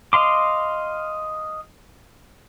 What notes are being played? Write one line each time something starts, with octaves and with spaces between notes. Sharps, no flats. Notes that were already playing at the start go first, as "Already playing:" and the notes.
D#5 F5 C6 D6